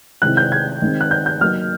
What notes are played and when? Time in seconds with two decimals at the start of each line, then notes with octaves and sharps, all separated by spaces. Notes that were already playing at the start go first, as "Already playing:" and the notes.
0.22 C3 D#3 G#3 C4 E4 F#6
0.37 G6
0.52 G#6
0.82 D#3 G#3 C4
1.01 F#6
1.11 G6
1.26 G6
1.41 F#3 A#3 D#4 F6